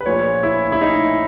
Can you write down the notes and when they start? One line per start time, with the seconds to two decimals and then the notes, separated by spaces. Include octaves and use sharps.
0.01 B4
0.06 A#1 A#2 C#5
0.43 E4
0.72 E4
0.81 D#4